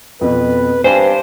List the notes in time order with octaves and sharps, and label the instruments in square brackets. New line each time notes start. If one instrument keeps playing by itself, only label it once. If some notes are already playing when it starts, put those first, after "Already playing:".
[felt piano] F2 B2 [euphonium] B4
[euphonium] G2 [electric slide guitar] C5 [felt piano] G#5